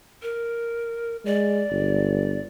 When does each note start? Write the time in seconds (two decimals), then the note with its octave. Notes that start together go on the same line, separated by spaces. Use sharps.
0.22 A#4
1.26 G#3 D5
1.71 G1